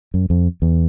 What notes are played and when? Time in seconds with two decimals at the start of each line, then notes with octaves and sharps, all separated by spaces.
0.14 F#2
0.30 F2
0.62 E2